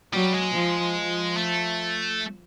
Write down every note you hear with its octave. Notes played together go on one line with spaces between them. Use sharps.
F#3 G3
G#3
F3
F3
A3